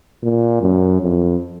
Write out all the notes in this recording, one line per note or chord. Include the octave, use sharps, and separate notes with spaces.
A#2
F#2
F2